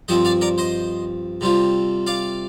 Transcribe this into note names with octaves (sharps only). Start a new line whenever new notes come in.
G2 F3 C4 C5 D#5
D5 F5
A#4 D5
C5 D#5
C3 G3 C4 F4
D5 F5